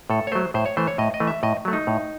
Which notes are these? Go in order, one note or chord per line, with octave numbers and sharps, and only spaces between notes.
A2 A4
C#5
F#3 A3 C5
A2 C5
C#5
E3 A3 C5
C#5
A2 D#5
D#5
E3 A3
E5
A2 D#5
F#3 A3
D#4
A2